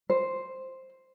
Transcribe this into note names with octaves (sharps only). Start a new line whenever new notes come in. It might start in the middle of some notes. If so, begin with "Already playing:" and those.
C5